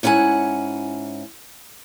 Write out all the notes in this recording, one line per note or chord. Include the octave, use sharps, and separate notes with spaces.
G#2 C#4 E4 F#5 G#5